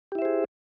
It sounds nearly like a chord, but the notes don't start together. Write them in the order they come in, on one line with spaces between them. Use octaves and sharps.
G4 E4 E5 C5 G#4